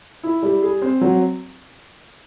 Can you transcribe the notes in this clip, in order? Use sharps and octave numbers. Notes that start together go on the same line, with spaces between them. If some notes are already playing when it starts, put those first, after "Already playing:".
E4
G3
G#4
C4
F#3